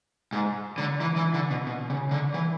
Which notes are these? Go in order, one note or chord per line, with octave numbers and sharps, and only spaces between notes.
G#2
D3
E3
E3
D3
B2
B2
C#3
D3
E3